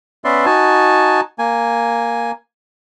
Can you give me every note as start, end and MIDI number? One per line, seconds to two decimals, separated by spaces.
0.24 0.46 59
0.24 0.46 61
0.24 0.46 71
0.24 0.46 74
0.24 0.46 76
0.24 0.46 84
0.46 1.21 63
0.46 1.21 66
0.46 1.21 80
0.46 1.21 81
1.39 2.31 58
1.39 2.31 80